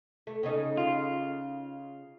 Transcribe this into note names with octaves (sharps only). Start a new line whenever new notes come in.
A3
C#3 C#4 D#4
F4